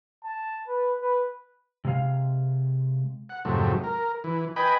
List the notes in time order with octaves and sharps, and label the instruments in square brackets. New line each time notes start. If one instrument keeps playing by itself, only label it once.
[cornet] A5
B4
B4
[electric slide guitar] C3 G#3 F5
[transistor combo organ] F#5
F2 G#2 C3 F#3 A3
A#4
E3
B4 D#5 G5 G#5 B5